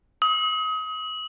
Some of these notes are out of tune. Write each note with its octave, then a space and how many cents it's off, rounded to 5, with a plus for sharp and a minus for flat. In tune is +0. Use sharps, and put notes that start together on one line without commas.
D#6 +30